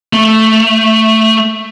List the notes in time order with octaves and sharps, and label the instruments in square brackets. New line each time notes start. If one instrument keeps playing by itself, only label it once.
[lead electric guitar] A3